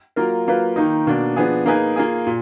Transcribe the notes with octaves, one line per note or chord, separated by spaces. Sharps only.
F#3 A#3 F4 A#4
F#3 A#3 F4 B4
D#3 A#3 D#4
B2 A#3 D4
F3 B3 D4 G#4
A#3 D#4 G#4 B4
A#3 F4 G#4
A#2